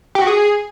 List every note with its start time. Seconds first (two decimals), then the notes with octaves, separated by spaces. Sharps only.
0.15 G4
0.21 F#4
0.27 G#4